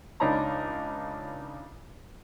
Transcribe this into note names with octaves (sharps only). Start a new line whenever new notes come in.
C#2 D4 D#4 C#5 A#5 B5